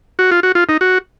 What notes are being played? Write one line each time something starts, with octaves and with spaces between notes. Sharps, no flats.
F#4
F4
F#4
F4
D#4
F#4